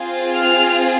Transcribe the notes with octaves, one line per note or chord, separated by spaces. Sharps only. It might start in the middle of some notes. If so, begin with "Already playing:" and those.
Already playing: C4 F4 G#4
F6